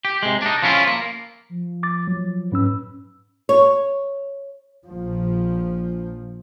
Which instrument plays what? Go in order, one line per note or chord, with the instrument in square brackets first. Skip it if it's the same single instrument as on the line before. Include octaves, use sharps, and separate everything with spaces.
[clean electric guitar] G4
C3 G#3
D4 D#4
F3 B3 C#4 E4 F4
A#3
[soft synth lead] F3
[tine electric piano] D6 A6
F#3
[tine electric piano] G#2 C#4 E6 [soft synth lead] B4
[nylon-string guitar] C#5
[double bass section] A#1 F3